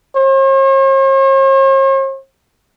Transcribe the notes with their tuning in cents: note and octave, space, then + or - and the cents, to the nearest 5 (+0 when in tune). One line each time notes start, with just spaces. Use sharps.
C#5 -45